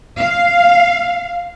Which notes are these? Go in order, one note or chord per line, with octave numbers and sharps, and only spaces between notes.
F5